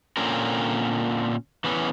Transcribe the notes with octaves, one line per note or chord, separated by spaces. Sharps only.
A#2 D3 C4 C#4 A#4
E3 B3 C#4